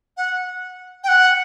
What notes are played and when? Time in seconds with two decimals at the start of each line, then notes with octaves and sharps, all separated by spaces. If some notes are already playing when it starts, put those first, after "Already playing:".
0.17 F#5
1.04 G5
1.08 F#5